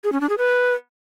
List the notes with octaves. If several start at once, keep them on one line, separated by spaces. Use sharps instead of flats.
G#4
C#4
D4
G#4
B4